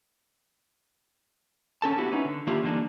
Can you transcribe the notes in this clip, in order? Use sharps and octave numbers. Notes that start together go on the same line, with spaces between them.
D3 C#4 A4 A5
B3 E4 F#4 G4
C#4 D#4 E4 B4
D3
D#3 A#3 D4 E4 F4 G4
D3 E3 G3 A#3 D4 D#4